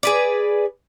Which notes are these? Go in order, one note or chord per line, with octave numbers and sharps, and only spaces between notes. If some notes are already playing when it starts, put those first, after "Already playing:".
G#4 B4 D5